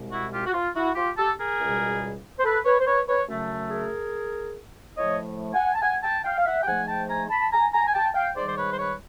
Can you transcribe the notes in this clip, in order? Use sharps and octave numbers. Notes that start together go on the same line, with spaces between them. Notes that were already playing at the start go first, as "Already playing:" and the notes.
Already playing: C2 B2 G#3
E4 F#4
F4 G4
F#4
F4
E4 F#4
F4 G4
G4 A4
G#4 A#4
C#2 B2 G3
C5
A4 B4
B4 C#5
C5
B4 C#5
B4 C#5
F#2 C#3 F#3 A3
G#4 A#4
A2 F3 A3 C#5 D#5
F#5 G#5
A5
F#5 G#5
G5 A5
F5 G5
F5
E5 F#5
G5
G#2 F3 A3 F#5 G#5
G5 A5
G#5 A#5
A5 B5
G#5 A#5
G#5 A#5
G#5
G5 A5
F5 G5
G#2 D#3 G3 C5 D5
C5
B4 C#5
C5
B4 C#5